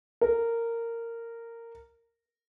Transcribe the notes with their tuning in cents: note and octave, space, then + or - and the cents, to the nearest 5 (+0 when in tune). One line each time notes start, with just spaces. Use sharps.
A#4 -15